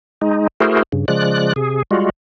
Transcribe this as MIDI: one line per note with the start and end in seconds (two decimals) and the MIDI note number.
0.22 0.47 56
0.22 0.47 63
0.60 0.83 57
0.60 0.83 64
0.60 0.83 66
0.60 0.83 68
0.60 0.83 70
0.60 0.83 72
0.92 1.05 43
0.92 1.05 49
1.08 1.53 49
1.08 1.53 53
1.08 1.53 56
1.08 1.53 74
1.08 1.53 90
1.56 1.83 48
1.56 1.83 68
1.91 2.10 55
1.91 2.10 56
1.91 2.10 65
1.91 2.10 66